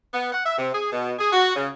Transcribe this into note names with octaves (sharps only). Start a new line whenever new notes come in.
B3
F#5
E5
C3
G#4
B2
G#4
F#4
C#3